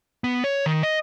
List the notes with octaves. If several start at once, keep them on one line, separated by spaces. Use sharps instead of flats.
B3
C#5
D#3
D#5